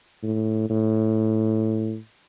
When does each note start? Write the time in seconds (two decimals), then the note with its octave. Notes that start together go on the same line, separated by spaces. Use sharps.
0.23 A2
0.70 A2